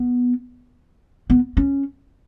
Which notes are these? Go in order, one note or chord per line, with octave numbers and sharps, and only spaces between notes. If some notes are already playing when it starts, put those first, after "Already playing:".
Already playing: B3
B3
C#4